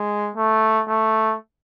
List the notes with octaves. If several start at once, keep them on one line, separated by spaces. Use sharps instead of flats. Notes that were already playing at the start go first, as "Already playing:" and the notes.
Already playing: G#3
A3
A3